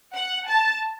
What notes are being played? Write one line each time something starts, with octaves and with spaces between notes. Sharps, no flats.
F#5
A5